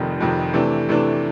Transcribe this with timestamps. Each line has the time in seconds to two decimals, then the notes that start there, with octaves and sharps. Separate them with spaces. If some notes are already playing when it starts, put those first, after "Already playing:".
Already playing: F1 F2 C3 D#3
0.20 F1 F2 C3 D#3
0.53 C3 E3 A3 D4
0.88 C3 E3 A3 D4